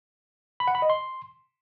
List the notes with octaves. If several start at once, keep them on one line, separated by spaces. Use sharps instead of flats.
B5
F#5
B5
D#5
C6